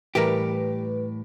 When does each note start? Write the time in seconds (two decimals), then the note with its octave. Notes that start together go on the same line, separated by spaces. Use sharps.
0.15 A2 E3 G3 G4 A#4 B4